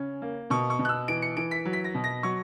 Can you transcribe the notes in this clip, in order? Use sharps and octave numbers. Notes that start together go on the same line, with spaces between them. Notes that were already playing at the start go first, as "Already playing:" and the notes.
Already playing: C#3 C#4
A#3
B2 C#6
C#6
B2
F#6
E6
E3 D7
C#7
E3 D7
B6
F#3
B6
A#6
B2
A#6
F#3 C#6